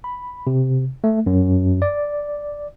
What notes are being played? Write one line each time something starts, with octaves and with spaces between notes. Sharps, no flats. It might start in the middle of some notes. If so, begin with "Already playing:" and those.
B5
C3
A3
F#2
D5